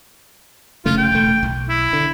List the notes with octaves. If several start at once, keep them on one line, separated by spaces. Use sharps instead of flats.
F1 C#3 A3 F4
G5
E1 A3
B1
E4
D3